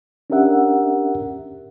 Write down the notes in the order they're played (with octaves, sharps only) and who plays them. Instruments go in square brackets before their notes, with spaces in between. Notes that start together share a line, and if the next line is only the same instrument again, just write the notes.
[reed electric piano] C#4 D4 G4 A#4 E5 F#5